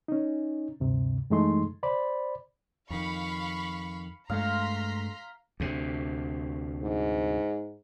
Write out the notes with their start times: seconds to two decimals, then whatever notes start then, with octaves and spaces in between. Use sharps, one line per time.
0.08 C#4 D#4
0.80 D2 G2 C3
1.30 F#2 E3 G#3 A3 D#4 C6
1.83 C5 D5 B5
2.90 F2 D#3 F5 B5 C#6
4.30 G2 G#3 A3 F5 A#5 C6 B6
5.60 D2 C3
6.83 G#2